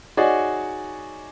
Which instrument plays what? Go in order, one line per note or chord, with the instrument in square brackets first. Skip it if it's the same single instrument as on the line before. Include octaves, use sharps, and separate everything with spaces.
[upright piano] D#4 F#4 G#4 C#5 D5